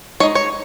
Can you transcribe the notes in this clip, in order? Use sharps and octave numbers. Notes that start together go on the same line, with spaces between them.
G#3 D#4 C#5
C#5